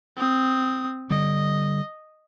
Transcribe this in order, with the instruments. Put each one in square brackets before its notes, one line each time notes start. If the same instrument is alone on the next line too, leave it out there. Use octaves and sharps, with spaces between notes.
[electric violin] C4 D#6
[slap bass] D3 G3 [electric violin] D#5